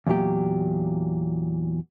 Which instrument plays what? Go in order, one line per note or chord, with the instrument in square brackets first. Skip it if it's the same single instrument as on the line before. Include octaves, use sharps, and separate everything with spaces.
[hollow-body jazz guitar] E2 A#2 F#3 G4